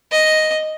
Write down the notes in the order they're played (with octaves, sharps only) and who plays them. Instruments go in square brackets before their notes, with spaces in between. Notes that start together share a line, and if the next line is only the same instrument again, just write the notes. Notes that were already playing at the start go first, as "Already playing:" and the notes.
[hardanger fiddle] D#5